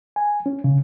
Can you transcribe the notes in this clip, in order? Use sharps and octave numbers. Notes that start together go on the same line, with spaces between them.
G#5
C#4
C#3